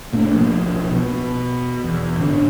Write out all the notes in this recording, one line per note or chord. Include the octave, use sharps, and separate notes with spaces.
A#1 A2 A#3 D4
B1 F3
B2
E2
G#2 D3 D4